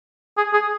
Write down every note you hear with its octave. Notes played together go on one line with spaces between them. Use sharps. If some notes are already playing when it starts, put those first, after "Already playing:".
G#4
G#4